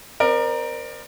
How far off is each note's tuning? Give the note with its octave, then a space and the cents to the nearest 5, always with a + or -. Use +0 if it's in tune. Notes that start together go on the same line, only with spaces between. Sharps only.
C4 -10 A#4 +10 D5 +35